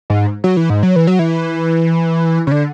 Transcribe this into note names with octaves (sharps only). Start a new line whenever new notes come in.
G#2
F#3
E3
G#2
F#3
E3
F#3
E3
C#3
D3